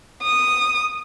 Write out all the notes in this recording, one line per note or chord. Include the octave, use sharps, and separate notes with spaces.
D#6